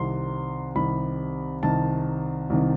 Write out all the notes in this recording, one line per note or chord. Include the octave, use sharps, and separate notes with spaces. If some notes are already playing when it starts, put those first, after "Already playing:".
Already playing: C2 C3 D#3 C6
C2 C3 D#3 B5
C2 C3 D#3 A5
C2 C3 D#3